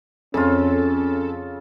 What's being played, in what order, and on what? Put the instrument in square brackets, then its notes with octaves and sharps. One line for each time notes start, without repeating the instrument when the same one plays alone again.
[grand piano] F2 [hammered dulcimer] C#3 F4 [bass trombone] C#4 [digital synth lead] A4